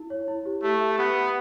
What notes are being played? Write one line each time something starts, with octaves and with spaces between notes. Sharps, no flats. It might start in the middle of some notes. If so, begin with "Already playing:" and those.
Already playing: E4
C#5
E4
G4
A3 G4
E5
B3 G4
B4